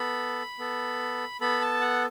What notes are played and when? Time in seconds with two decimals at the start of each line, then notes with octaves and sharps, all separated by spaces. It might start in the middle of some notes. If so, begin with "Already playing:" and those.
Already playing: B3 A4 B5
0.59 B3 A4
1.41 B3 A4 B5
1.61 A5
1.81 F#5